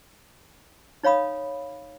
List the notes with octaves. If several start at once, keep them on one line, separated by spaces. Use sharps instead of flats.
D#4 C#5 F5 B5 D#6